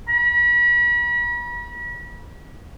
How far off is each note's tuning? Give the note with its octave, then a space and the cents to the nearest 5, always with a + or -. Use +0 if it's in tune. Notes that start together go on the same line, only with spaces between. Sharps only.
B5 -40